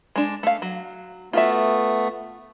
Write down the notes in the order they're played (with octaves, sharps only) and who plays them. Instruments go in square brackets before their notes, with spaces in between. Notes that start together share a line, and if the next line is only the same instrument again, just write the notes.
[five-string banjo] G#3 D4
A3 F5
F#3
[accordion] A3 B3 [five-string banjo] F4 F#4 E5